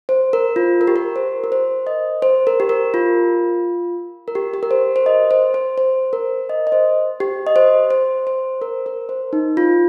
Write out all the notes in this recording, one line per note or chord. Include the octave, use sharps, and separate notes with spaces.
C5
A#4
F4
A#4
G4
A#4
C5
A#4
C5
D#5
C5
A#4
G4
A#4
F4
A#4
G4
G4
A#4
C5
C5
D#5
C5
C5
C5
A#4
D#5
D#5
C5
G4
D#5
C5
C5
C5
A#4
A#4
C5
D#4
F4